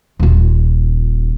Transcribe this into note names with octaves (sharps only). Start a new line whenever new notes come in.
D#1 F4